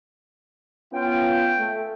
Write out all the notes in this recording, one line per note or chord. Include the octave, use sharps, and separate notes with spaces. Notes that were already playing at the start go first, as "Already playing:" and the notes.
B3 C#4 F4 G5
A3